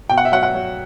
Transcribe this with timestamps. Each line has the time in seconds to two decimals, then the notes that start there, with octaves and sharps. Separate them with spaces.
0.09 B2 G5
0.18 F#5
0.25 E5
0.32 F#3 F#5
0.43 F#5
0.54 F#3